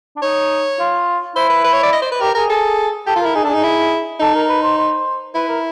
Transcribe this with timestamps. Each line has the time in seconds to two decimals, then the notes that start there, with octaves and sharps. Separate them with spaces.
0.16 D4
0.22 D#4 C#5
0.79 F4
1.36 E4 C5
1.50 B4
1.65 B4
1.73 C#5
1.83 D5
1.93 D#5
2.02 C5
2.12 B4
2.21 G4 A#4
2.35 G#4 A#4
2.50 G#4 A4
3.07 G4 A4
3.16 F4
3.21 A#4
3.26 E4
3.35 D#4 G#4
3.44 D4 A4
3.49 G#4
3.54 D#4
3.63 E4
4.20 D#4 A4
4.35 A#4
4.49 B4
4.63 C5
4.77 C5
5.34 E4 B4
5.48 A#4